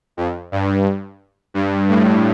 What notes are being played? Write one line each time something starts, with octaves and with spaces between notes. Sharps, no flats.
F2
G2
G2
A2